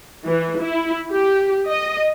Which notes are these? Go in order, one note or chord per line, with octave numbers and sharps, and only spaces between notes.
E3
E4
G4
D#5